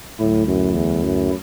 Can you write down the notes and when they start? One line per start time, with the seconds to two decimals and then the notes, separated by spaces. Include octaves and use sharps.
0.19 D2 A2 D3 F#3 A3 E4
0.47 F#2
0.75 E2
1.03 F#2